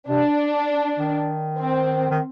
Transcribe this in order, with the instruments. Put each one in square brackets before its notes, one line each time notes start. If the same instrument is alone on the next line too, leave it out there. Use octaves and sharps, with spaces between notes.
[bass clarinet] C3 [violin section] D4
[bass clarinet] D#3
[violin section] C4
[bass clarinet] D#3